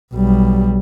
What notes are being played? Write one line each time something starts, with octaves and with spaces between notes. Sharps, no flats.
B1 G3